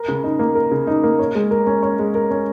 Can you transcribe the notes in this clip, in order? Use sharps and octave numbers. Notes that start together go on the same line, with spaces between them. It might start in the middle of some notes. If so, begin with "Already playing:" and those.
Already playing: A#4
C#3
D#4
A#3
A#4
C#3
D#4
A#3
C#5
G#3
A#4
C#4
C#5
G#3
A#4
C#4